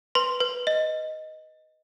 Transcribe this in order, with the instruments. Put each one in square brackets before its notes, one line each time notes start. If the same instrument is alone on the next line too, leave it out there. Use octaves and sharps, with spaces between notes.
[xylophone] B4 C6
B4
D#5